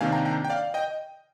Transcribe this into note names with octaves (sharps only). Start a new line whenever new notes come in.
C3 D#3 A#3 D4 F5 G#5
G5 A#5
G5 A#5
G5
D5 F5
D#5 G5